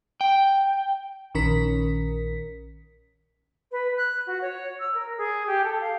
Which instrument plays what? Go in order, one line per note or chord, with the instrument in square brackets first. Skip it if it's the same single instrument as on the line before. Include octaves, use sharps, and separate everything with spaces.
[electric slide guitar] G5
[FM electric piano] A#1 D#3 C#4 A#4 B6
[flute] B4
F#6
F#4
C#5
E6
A#4
G#4
G4
A4
F5